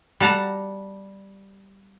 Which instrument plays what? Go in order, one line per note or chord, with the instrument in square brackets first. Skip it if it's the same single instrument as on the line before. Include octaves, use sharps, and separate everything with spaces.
[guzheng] G3 F#5 A5 A#5